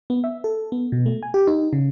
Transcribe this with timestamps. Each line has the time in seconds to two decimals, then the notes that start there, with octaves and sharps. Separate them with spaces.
0.10 B3
0.24 E5
0.44 A4
0.72 B3
0.92 B2
1.06 A3
1.23 G#5
1.34 G4
1.47 D#4
1.73 C#3